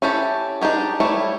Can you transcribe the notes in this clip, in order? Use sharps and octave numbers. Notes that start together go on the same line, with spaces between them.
C#4 E4 G4 A4
D4 D#4 G4 G#4
G3 A3 E4 C#5